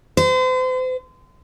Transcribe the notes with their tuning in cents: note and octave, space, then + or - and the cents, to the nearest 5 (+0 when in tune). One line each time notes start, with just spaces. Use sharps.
C5 -40